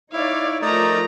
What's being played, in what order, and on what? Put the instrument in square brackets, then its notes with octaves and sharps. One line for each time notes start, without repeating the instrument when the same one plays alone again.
[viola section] D#4 C#5 D5 [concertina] E4 [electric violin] F5
[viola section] F3 A#4 [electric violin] A3 A#5 [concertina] D#4 D5